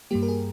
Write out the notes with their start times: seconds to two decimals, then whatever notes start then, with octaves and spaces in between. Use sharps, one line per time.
0.11 G2 G3 A#3 G4
0.23 A#4
0.28 G#4